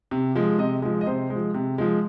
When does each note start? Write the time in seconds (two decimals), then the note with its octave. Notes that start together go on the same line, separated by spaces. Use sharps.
0.11 C3
0.35 F3 G#3
0.58 C3 D#5
0.82 F3 G#3
1.01 D#5
1.06 C3 C5
1.30 G#3
1.35 F3
1.54 C3
1.78 F3 G#3